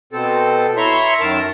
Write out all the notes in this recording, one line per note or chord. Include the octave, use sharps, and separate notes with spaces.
B2 C4 A4
E4 C#5 E5 A#5 C6 C#6
F#2 D#3 A#4 A5